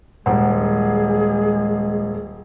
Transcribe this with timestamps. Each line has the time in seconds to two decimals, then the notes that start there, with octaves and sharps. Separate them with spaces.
0.26 D#1 G#3 G#4 C5 F#5